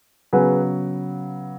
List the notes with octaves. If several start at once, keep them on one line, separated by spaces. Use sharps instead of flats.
C#3 F#3 B3 G#4 B4